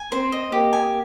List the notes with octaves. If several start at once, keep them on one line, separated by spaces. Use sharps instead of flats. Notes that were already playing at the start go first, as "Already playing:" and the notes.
Already playing: G#5
C4 C5
D#5
A#3 G4
G#5